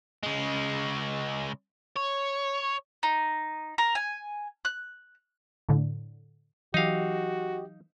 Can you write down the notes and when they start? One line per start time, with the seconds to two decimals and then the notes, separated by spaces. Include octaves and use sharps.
0.23 C#3 G#3
1.96 C#5
3.03 D#4
3.78 A#4
3.95 G#5
4.65 F#6
5.69 A2 D3
6.74 E3 F#3 D#4 F#4 G4 D#5 F5